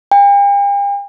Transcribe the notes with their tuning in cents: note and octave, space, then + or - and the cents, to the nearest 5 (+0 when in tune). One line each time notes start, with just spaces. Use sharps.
G5 +45